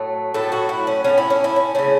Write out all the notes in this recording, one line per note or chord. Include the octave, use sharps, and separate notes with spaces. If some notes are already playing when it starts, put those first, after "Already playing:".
Already playing: A2 F#3 A3
A2 F#3 A3 A4
F#4
E4
C#4
A2 F#3 A3 C#4
E4
C#4
E4
C#4
C#3 A3 C#4